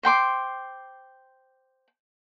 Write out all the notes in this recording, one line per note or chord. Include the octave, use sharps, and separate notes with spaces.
C5 G5 C6 D6